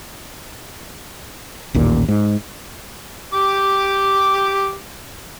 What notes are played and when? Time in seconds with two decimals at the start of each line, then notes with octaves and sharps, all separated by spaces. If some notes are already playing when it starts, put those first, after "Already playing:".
1.74 A1 D#2 A#2
2.08 G#2
3.34 G4 D6